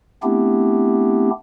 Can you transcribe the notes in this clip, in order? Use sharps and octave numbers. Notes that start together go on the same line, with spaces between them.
A3 B3 C4 D4 E4 G4